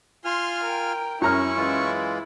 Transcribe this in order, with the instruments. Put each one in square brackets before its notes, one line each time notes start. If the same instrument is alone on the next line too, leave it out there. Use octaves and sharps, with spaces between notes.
[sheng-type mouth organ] F4 G#5 F6 [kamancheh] C6
[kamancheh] A#4 G5
[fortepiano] F#2 A#5 F6 [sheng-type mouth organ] C#4 C#6 [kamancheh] E4
[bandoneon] E3 G#3 F4